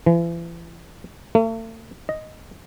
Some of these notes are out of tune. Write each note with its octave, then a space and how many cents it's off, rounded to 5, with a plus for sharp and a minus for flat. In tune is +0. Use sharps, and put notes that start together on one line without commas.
E3 +40
A3 +40
D#5 +0